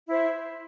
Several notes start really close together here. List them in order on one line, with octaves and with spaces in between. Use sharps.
E4 C5 E5